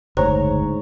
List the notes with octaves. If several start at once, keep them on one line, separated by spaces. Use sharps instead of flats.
F#1 D2 G#2 C5 C#5 A#5